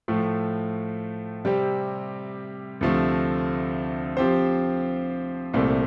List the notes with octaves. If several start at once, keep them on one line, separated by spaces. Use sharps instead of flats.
A2 F3 A3
C3 G3 C4 G4
D2 C3 F3 A3
F3 C4 G4 C5
C2 A#2 A3 C4